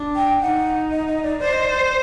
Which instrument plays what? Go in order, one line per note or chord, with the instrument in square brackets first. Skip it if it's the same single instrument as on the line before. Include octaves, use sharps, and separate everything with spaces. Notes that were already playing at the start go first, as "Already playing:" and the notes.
Already playing: [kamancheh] D4
[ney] G5
[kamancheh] D#4 [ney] F#5
[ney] D#5
D#5
D5
[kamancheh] C5 [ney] D5
[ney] D#5
D5